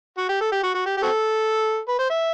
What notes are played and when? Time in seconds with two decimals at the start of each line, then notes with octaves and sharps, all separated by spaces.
0.18 F#4
0.29 G4
0.41 A4
0.52 G4
0.64 F#4
0.75 F#4
0.86 G4
0.98 G4
1.03 C4 F#4 A4
1.88 B4
1.99 C5
2.10 E5